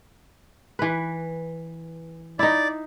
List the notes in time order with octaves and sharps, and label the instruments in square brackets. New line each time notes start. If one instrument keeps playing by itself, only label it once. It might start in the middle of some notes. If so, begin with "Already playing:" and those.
[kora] E3 B4
[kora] D#4 E4 [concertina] D5